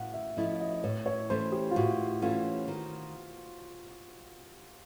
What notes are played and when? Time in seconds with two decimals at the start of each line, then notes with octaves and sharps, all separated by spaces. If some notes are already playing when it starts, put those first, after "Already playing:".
Already playing: A2 F5 F#5
0.14 E5
0.37 F3 A3 C#4 E4 D#5
0.60 D#5
0.84 A2 C#5
1.06 C#5
1.30 E3 A3 C#4 C5
1.52 G4
1.71 F4
1.76 A2 F#4
2.22 E3 A3 C#4 F4
2.68 D#3